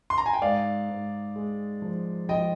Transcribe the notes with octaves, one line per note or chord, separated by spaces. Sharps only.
C6
A#5
G#5
G5
G#2 D5 F5
G#2
G#3
F3
F3 D#5 G5